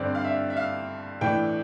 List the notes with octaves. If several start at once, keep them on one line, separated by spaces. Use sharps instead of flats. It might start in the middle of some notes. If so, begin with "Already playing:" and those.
Already playing: G2 D3 G3 C4 D5
F5
E5
E5
F5
A2 E3 A3 D4 G5